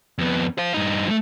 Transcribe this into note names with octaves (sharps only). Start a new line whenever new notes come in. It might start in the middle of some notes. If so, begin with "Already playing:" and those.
F2 B3
C5 F5
G2 D#4
F3 A3